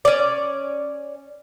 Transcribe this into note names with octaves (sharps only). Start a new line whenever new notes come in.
C#4 D5